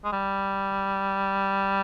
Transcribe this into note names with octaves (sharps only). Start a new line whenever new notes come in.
G#3
G3